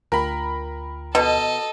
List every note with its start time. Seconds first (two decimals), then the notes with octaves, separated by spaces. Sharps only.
0.12 D2 F4 A#4 G5 B5
1.15 B2 A4 D#5